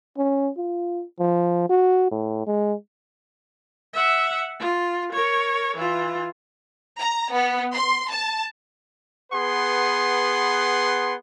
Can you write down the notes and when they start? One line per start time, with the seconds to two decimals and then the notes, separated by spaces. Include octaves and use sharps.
0.17 C#4
0.57 F4
1.19 F3
1.69 F#4
2.11 A2
2.47 G#3
3.93 E5 F#5
4.59 F4
5.12 A#4 C#5
5.77 E3 F4
6.99 A#5
7.33 B3
7.73 C6
8.09 A5
9.32 B3 G#4 B4 F#5 C6